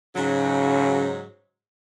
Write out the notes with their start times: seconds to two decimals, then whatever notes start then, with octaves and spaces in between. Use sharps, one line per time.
0.16 G#2 C#3 F#3